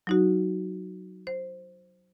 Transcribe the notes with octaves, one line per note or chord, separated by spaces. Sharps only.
F#3 D#4 F#4
C5